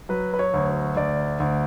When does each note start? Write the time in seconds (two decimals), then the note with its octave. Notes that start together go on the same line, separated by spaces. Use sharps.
0.09 F#3 B4
0.34 B4
0.39 C#5
0.54 D2
0.96 D2 D5
1.40 D2